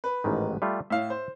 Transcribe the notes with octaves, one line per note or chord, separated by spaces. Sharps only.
B4
A1 G#2 D#3
G3 A3 F4
A2 E5 F5
C5